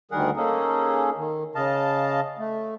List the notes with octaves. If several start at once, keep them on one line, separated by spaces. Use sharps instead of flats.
D2 D#3 G3 G#4 A#4 F#5
A#3 C#4 D#4 G#4 A4
D#3
C#3 D#5 F5 A5
A3